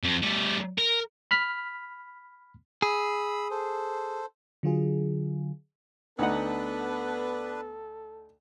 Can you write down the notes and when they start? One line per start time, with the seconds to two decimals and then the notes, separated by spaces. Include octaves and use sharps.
0.04 F2
0.23 G3 A3
0.79 A#4
1.31 B5 F6 B6
2.82 G#4 B5 E6
3.51 A4 C5
4.63 D3 F#3 F4 G#4
6.19 D2 B3 D4 D#4 A4 B4 F#5